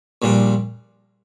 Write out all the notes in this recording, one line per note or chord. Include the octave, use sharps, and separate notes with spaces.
A#1 A#2 G3 D4